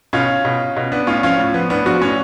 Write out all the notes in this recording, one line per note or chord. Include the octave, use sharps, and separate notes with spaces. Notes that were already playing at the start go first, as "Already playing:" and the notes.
B2 C#4 F4
B2
B2
B3 D4
A2 C#4 F4
F3 C#4 F4
A2
F3 B3
A2 B3 D4
F3 D4 F#4
A2 C#4